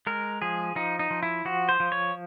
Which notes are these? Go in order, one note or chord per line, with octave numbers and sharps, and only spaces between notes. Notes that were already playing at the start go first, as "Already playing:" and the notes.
G#3 A#4
F3 G#4
F3 D#4
D#4
F3
E4
F3 F#4
C5
F3
C#5